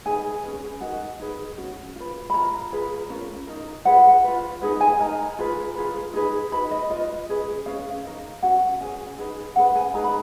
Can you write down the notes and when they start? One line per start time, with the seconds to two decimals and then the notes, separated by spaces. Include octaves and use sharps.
0.05 D#4 G#4 B4 G#5
0.43 C#4 G#4 B4
0.81 D#4 F#4 A#4
1.20 D#4 G#4 B4
1.58 C#4 F#4
1.96 F4 B4
2.30 B5
2.33 F4 A#4 A#5
2.72 F4 G#4 B4
3.10 C#4 F4 A#4
3.47 D#4 A#4
3.85 F4 G#4 B4 F#5
4.24 F4 B4
4.62 D#4 G#4 B4
4.81 G#5
4.99 D#4 A#4 A#5
5.39 F4 G#4 B4
5.76 F4 G#4 B4
6.14 D#4 G#4 B4
6.52 D#4 F#4 B4 B5
6.71 D#5
6.90 F4 B4 D#5
7.29 C#4 G#4 B4
7.66 C#4 G#4 B4 F5
8.04 D#4 A#4
8.42 C#4 F#4 B4 F#5
8.80 C#4 G#4 B4 G#5
9.18 D#4 G#4 B4
9.56 C#4 G#4 B4 F#5
9.76 G#5
9.94 D#4 G#4 B4 A#5
10.04 B5